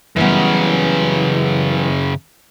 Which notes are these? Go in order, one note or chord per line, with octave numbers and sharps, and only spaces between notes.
F#2 C#3 E3 G3 B3